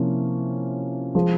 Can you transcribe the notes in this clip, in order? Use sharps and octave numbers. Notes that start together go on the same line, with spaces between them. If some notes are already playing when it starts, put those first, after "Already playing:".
Already playing: C3 F3 A#3 C#4 E4
F3 G#3